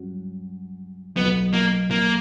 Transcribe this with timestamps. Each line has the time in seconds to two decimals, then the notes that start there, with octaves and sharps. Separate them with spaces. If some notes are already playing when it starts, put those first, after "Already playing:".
Already playing: G2 F#3 C#4 F#4
1.17 B1 B2 F#3 B3
1.53 A#3
1.91 A#3